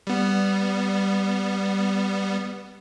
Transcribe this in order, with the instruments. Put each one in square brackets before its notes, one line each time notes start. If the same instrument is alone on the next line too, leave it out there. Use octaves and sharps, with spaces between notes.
[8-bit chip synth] G3 B3